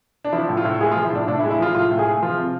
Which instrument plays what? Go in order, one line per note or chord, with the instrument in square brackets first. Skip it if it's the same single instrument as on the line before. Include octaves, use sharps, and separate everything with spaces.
[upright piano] D4
F3 E4
A2
F4
A2
G#3 G#4
F4
F3
E4
A2 D4
A2 D4
E4
G#3
E4
F3 F4
A2 F4
A2
G#4
G#3
F3 F4
C3